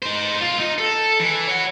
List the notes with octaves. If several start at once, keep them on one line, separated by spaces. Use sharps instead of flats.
D#4 C5
B1 F4
D#4
A4
E3
C#5 F#5